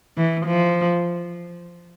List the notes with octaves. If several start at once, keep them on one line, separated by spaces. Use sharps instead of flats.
E3
F3